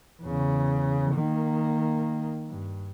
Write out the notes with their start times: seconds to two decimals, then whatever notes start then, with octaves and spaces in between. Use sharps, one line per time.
0.22 E2 C#3
1.13 D#3 A#3
2.49 G2